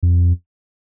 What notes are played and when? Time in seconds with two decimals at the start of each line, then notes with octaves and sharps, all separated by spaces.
0.03 F2